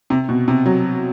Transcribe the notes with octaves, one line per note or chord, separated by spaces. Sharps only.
C3
B2
C3
F#3